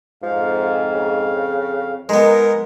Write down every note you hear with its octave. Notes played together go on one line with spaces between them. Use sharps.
F2 G#2 F3 F5
C#3
G#3 B3 D#4 A#4